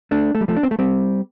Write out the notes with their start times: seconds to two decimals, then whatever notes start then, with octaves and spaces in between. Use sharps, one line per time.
0.11 A3 D4
0.35 A3
0.41 G3
0.48 F3 A3
0.56 D4
0.63 C4
0.71 A3
0.79 G3 C4